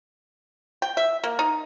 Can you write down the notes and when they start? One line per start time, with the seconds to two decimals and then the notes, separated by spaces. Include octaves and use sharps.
0.82 G5
0.97 E5
1.24 A#3
1.39 D#4